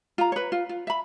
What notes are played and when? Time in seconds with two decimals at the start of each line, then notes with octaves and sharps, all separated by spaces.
0.18 F4 A#5
0.32 B4 C#5
0.52 F4
0.69 F4
0.87 E5 B5